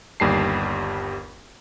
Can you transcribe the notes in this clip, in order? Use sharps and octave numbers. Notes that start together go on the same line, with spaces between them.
G1 D#2 G3 A5 C7